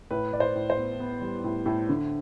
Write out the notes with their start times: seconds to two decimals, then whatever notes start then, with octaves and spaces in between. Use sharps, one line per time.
0.11 A2 B4
0.33 A2 D5
0.40 C5
0.55 A2
0.70 C5
0.77 B3
1.00 B3
1.21 G3
1.44 A2
1.66 A2
1.89 D3